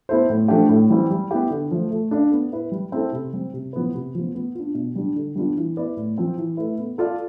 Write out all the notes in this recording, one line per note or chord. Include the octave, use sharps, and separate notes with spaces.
B3 E4 A4 C5
A2
F3 A3 D4 G4
A2
E3 G3 C4 G4
G3
B3 E4 G4
D3
F3 A3
A3
D4 A4 D5 F5
B3
E4 B4
G3
C4 E4 A4
C3
G3 C4
C3
F3 B3 E4 B4
C3
F3 B3
B3
D4 F4
B2
G3 D4
D3
G3 B3 D4 F4
E3
B3 E4 B4 D5
A2
F3 C4
E3
A3 E4 B4
B3
F4 A4 D5 F5